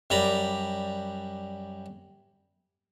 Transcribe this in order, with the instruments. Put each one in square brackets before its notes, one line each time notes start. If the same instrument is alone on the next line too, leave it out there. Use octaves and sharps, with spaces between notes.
[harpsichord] F#2 G3 D5 A#5 B5